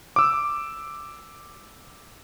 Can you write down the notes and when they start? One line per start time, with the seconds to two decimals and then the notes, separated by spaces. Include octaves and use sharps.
0.16 D6 E6